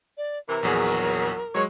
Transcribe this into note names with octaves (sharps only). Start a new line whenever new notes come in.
D5
C3 E3 A#4
A#1 E2 F#3 G#4
F#3 G#3 G#4 C#5